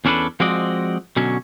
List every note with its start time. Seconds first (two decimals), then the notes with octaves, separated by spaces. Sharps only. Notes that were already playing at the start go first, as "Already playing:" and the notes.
0.05 E2 C#4 D4 A4 B4
0.40 F3 G#3 C4 F#4 D5 D#5
1.16 B2 D3 F#3 C#4